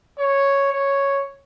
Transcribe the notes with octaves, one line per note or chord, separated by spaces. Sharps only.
C#5
C#5